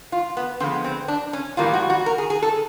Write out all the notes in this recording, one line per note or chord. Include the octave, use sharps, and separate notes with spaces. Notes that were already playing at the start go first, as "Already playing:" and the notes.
F4
B3
D3 F3 G#3 B3 C4
C4
D4
C#4
A2 E3 G3 A#3 F4
F#4
F#4
A#4
G#4
G#4
A4